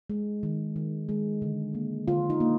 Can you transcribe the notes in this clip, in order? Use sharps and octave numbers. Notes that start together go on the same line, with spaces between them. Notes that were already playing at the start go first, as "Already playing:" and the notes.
G#3
D#3
D#3
G#3
D3
A#3
D3 F4
D#4
A#3